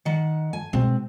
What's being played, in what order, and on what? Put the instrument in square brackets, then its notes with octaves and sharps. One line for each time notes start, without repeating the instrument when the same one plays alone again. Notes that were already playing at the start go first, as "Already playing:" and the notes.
[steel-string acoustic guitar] D#3 F#5
G#5
[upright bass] B2 G#3 [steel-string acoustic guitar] C4